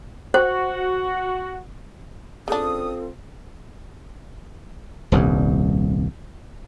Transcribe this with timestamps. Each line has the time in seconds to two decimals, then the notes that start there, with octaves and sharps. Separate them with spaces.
0.34 F#4 C5
2.48 C#3 C4 D4 F4 A4 D#6
5.12 D#1 C2 G2